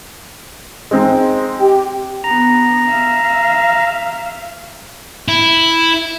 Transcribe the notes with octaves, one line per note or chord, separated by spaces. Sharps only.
G#3 C4 D#4
G4 G5
B3 D4 A#5
E5 F5
E4